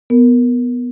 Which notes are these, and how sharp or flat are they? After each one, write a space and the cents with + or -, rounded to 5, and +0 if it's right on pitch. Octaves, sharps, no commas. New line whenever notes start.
B3 +0 A#4 -5